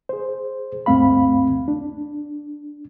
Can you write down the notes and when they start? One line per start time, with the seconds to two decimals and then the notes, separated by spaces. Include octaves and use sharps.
0.09 G#4 C5
0.86 D2 G2 A3 C4 F5 B5
1.68 D4